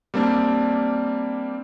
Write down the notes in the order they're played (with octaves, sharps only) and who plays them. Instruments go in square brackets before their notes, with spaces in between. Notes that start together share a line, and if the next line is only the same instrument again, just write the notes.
[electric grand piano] G3 A#3 C4 D4